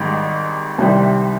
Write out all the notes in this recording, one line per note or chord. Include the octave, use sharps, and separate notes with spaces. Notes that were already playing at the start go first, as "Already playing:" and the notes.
Already playing: G#1 G#2 D#3 G3
C2 C3 D#3 G3 C4